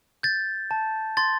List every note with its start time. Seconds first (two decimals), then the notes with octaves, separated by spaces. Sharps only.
0.23 G6 A6
0.71 A5
1.17 C6 A6